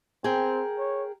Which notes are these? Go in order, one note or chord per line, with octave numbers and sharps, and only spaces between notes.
C4 G#4 A#4 G5
C#5